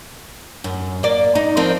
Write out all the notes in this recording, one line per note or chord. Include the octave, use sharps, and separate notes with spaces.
F#2
A#3 D5
D#4
F3 C4 A#4